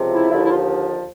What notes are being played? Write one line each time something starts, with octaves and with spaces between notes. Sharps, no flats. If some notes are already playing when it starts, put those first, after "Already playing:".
Already playing: C#2 C3 F3
E4
D#2 D3 F3 E4
E4
F4